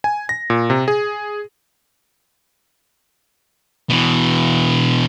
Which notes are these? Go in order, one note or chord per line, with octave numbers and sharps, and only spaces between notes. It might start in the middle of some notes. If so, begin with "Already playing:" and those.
G#5
A#6
A#2
C3
G#4
B2 E3